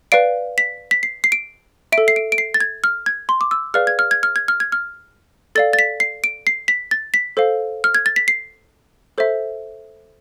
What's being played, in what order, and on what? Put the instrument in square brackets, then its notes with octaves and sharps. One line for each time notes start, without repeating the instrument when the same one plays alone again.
[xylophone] B4 D5 F5 D7
B6
B6
C7
C7
D7
E5 D7
A4
C7
D7
D7
C7
A6
G#6
F6
G#6
C6
D6
E6
G#4 B4 D5 F5 F6
G#6
F6
G#6
F6
G#6
F6
G#6
F6
A4 D5 F5 A6
A6
B6
C7
D7
C7
B6
A6
B6
A4 C5 F5
F6
G#6
A6
B6
C7
A4 C5 E5